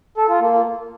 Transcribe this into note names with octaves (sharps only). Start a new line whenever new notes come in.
A4
F4
A#3